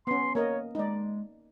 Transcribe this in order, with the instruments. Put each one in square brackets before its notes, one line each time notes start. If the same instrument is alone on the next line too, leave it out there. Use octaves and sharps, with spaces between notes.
[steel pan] B3 C#4 [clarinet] C6
[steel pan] A#3 A#4 D#5 [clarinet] C#5
[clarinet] G#3 [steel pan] D#4 D5